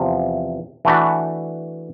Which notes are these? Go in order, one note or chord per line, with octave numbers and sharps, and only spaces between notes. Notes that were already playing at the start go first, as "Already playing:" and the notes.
Already playing: E2 C3 F3
E3 A3 D4 F#4 B4